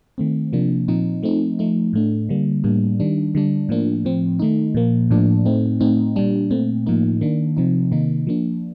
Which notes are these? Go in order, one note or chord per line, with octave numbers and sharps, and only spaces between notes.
D#3 A3 C4
C3 F3 A#3 D4
A#2 F3 C4 D#4
F3 A3 C4 D#4
F3 A3 D#4
A2 A3 D4
D3 G3 A#3
A2 G3 A#3 D4
D#3 G3 D4
D3 G3 D4
A2 F3 A#3 D4
A2 F3 C4
D#3 A3 D#4
A#2 F3 A#3
A2 F3 A#3 D4
A2 A3 C4 D#4
A2 A3 C4 D#4
A#2 G3 D4
A#2 A3 C4
A2 F3 A#3 D#4
D#3 A#3 D4
C3 F3 C4 D#4
C3 D#3 A#3 D#4
F3 A#3 D4